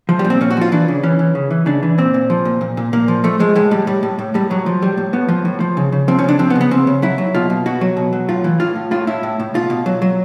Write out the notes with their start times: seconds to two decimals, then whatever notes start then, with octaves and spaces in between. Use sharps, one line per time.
0.09 F3
0.19 G3
0.24 A#2
0.30 C4
0.41 A#2 C#4
0.50 F#4
0.57 F3 F4
0.72 E3 D4
0.88 C#3
1.03 E3 C#4
1.19 E3
1.35 C#3
1.51 E3
1.66 C#3 D4
1.83 E3
1.98 A#2 C4
2.14 A#2
2.30 F3
2.45 A#2
2.61 A#2
2.77 A#2
2.93 A#2 A#3
3.08 F3
3.24 F3 A3
3.39 F3 G#3
3.55 A2 G#3
3.71 A2 G3
3.87 A2 G3
4.03 A2
4.19 A2
4.34 A2 G3
4.50 A2 F#3
4.66 F3
4.82 A2 G3
4.97 A2
5.13 A2 B3
5.29 F3
5.45 A2
5.60 F3
5.77 C#3
5.92 C#3
6.08 F3 C4
6.19 C#4
6.24 C#3 D4
6.39 F3 C4
6.50 B3
6.55 C#3
6.61 B3
6.71 C#3 C4
6.87 C#3
7.02 F#3 E4
7.18 F#3
7.34 B2 F4
7.50 B2
7.66 B2 F#4
7.81 F#3
7.97 B2
8.13 F#3
8.29 A2 F4
8.44 E3
8.60 A2 F4
8.75 A2
8.91 A2 F4
9.07 A2 E4
9.23 A2
9.40 A2
9.54 B2 F4
9.70 B2
9.86 F#3
10.02 F#3